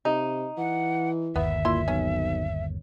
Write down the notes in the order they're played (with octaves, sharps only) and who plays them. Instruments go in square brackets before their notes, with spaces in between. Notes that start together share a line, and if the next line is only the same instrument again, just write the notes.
[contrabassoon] C3 [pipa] D#4
[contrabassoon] E3 [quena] F#5
[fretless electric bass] G1 D#2 [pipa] B3 [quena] E5
[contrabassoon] A#2 [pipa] E4 C6
[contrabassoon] B1 [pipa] C#4